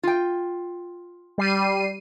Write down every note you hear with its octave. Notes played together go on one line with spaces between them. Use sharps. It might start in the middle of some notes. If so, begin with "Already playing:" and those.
F4 G5
G3 C7 D#7